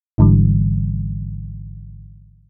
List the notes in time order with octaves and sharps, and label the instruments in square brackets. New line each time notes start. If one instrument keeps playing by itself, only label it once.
[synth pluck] G#1 G#2 D3 E3 G3